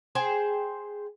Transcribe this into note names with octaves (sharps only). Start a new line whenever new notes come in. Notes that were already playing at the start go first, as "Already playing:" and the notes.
G#4 C5 G5